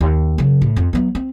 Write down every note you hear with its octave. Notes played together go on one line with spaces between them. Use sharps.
D#2
C#3 F#3
A2
F2
F#3 B3
C4